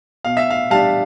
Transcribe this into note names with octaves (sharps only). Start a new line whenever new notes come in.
B2 F5
E5
F5
G3 D4 F5 A5